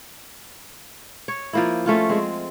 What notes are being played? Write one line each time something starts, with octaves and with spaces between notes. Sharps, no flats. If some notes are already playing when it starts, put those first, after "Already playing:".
C#5
F3 A#3 E4
A3 C#4 F4
G#3 C4